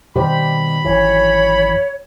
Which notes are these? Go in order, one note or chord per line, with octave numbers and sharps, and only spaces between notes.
B2 D#3 G3 G4 C5 B5
G#1 F#2 E3 C#5